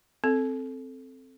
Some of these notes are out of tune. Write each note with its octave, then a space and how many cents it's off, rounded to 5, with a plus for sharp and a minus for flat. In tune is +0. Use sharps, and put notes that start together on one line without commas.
C4 +0 A4 +0